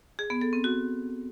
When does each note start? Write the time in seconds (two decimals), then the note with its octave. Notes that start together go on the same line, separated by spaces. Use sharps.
0.19 G#4
0.30 B3
0.41 A4
0.53 C4
0.64 F#4